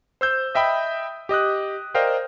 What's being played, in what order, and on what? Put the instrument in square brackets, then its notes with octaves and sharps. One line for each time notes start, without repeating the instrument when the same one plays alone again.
[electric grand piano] C5 E6 G6
D#5 E5 G5 B5 D#6
G4 D#5 D#6 F#6
A#4 C5 D5 D#5 F5 G5